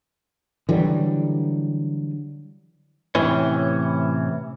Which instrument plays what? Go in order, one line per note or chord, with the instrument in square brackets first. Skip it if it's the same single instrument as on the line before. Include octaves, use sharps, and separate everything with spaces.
[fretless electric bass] D3 E3 F#3 G3
[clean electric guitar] A2 C3 E3 C#4